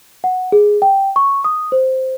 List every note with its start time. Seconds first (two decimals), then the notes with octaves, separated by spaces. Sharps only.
0.24 F#5
0.52 G#4
0.82 G5
1.16 C#6
1.44 D#6
1.72 C5